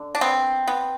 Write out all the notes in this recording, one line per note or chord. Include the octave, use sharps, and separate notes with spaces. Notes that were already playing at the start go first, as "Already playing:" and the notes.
Already playing: D3
D4
B3 C4
B3